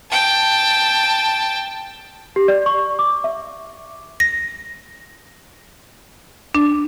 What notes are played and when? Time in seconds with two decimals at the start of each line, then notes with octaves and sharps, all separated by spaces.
0.11 G5 A5
2.36 G4
2.48 D5
2.66 C#6
2.99 D6
3.24 E5
4.20 A#6
6.55 D4